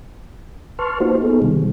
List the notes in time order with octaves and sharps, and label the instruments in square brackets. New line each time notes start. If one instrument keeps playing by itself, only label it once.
[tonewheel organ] B4 A5 C6 C#6 F6
A#3 D#4 F4 F#4 C5
B3 D#4 G#4 A4
C3 D#3 G3